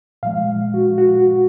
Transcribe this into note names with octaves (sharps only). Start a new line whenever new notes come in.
A#2 F3 G#3 F5
F#4
F#4